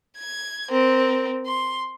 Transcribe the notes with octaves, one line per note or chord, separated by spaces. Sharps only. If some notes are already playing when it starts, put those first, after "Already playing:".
G#6
C4 A#4
C6